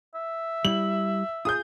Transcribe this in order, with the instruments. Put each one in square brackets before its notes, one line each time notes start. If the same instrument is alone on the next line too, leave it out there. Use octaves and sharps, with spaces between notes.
[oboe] E5
[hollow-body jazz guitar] G3 E4 [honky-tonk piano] F#7
[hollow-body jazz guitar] F4 G#4 [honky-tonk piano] D#6 G6